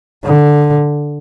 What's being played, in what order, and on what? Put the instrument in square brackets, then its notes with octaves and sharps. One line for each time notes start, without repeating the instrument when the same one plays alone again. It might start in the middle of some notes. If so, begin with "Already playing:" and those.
[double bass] D3